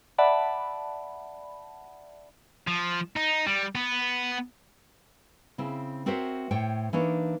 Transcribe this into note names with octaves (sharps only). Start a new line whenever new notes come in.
D5 E5 F#5 A5 B5
F3
D#4
G3
B3
C#3 C4 E4
C4 F#4 A#4 C5 C#5 E5
A2 C5 C#5 G5
E3 A#3 D4 D#4 C#5